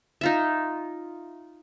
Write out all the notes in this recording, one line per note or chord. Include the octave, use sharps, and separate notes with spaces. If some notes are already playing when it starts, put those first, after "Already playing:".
D#4 F4 E5